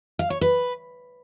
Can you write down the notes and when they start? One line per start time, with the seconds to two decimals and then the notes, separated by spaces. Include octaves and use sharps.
0.19 F5
0.30 C#5
0.41 B4